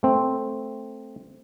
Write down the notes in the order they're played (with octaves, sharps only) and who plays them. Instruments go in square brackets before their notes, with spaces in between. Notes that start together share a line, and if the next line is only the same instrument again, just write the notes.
[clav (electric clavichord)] A3 C4